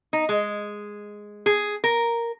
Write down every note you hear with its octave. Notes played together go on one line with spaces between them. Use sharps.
D#4
G#3
G#4
A#4